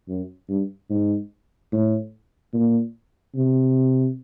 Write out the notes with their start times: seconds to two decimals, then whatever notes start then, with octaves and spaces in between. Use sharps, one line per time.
0.08 F#2
0.49 G2
0.90 G#2
1.72 A2
2.53 A#2
3.35 C3